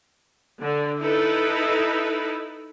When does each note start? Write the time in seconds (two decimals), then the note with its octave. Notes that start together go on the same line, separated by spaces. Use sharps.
0.60 D3
0.99 D#4 E4 A4 B4